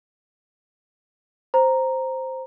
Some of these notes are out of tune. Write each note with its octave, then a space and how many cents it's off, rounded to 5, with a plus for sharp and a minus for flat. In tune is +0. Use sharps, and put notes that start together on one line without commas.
C5 +0 A#5 +0